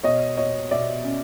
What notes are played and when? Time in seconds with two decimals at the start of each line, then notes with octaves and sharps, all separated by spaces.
0.03 B2 C#5 D#5
0.37 B2 C#5 D#5
0.71 B2 D5 E5
1.04 C#4